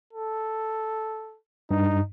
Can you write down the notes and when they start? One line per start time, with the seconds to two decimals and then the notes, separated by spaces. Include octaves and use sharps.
0.13 A4
1.71 G2 D#4